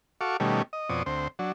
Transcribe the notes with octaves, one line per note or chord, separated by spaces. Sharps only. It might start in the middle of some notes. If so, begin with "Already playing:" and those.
F#4 A4 F5 C#6 D6
B2 D#3 G3 A3 C#4
D#5
F2 B2 C4 C#5 D5 D#6
D2 C4 C5
F#3 D4